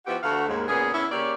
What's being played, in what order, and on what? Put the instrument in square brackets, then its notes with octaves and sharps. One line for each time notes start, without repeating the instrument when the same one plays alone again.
[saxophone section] F3 B3 E4 F#4 G4
D2 A3 F#4 F5 F#5
D#2 G#2
A#2 C#3 B3 G#4
B3 C#4 E4
C#3 A#3 G4 C#5 D5